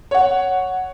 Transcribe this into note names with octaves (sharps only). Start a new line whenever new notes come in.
C#5 F#5